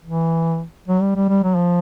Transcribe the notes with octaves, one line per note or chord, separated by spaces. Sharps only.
E3
F#3
G3
G3
G3
F#3
F3